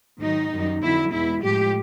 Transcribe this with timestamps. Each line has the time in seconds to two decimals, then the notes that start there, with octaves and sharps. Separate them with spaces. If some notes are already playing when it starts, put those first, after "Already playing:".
0.21 G#2 D#3 F#3 D#4
0.51 F#2 D#3 G3
0.82 F2 D3 F#3 E4
1.12 E2 B2 G#3 E4
1.43 A2 F3 G#3 G4